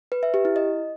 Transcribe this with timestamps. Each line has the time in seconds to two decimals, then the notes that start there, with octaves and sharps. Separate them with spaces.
0.12 B4
0.23 E5
0.34 G4
0.45 E4
0.56 D#5